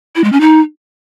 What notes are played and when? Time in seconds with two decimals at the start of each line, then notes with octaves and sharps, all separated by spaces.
0.16 E4
0.24 G#3
0.32 C#4
0.41 D#4